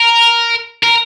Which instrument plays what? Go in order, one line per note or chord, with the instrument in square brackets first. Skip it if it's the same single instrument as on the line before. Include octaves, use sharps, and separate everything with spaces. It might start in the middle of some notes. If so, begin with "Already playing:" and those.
Already playing: [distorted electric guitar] A#4
A#4